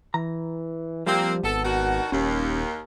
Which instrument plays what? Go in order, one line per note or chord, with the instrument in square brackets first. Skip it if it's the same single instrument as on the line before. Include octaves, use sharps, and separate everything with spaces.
[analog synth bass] E3 [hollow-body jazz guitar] A#5
[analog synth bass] F3 [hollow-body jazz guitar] G3 G4 D5 [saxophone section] A#3 C4
[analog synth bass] G#1 [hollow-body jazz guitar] B3 [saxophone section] A4
[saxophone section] D#3 D4 F#4
[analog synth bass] D#1 [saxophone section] D#2 [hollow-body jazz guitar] C#4